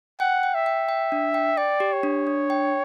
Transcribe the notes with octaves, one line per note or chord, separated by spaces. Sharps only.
F#5 G5
G5
E5
G5
G5
D4
G5
D5 G5
G4
C#5
D4
D4
G5